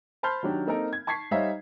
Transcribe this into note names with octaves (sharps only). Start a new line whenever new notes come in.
C5 A5 B5 C6 F6 G6
D#3 F#3 D4 G4
A#3 C4 D#4 A4 A#4
G#6
A5 C#6 G#6 B6 C7
G3 D#4 C5 C#5 E5 F5